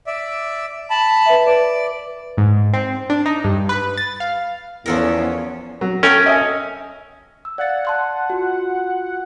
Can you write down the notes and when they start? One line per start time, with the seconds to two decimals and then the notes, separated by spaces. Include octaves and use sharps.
0.07 D5 E5
0.90 A5 B5
1.26 B4 E5
1.46 B4 D5
2.38 G#2
2.73 C4
3.10 D4
3.26 D#4
3.44 G2
3.69 B4
3.97 A6
4.20 F5
4.86 E2 F3 B3 C#4 A4 A#4
5.81 F#3
6.03 C#4 A4 A#4 G5
6.26 D#5 E5 G#5
7.45 E6
7.58 D5 F5 F#5 A6
7.85 A5 C6 F#6
8.30 F4 F#4